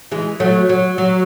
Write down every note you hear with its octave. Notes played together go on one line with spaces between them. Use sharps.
E3 G#3
F#3 A3
F#3
F#3